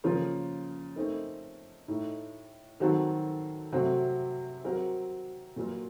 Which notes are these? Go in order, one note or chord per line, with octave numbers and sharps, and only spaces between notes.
C#3 F3 A#3 F4 A#4
A3 C4 D#4 A#4
A2 A3 D#4
D#3 F#3 C4 F#4 A4
C3 F#3 A3 C4 F#4
F#3 C4 F#4 A#4
A#2 F#3 A#3 F4 A#4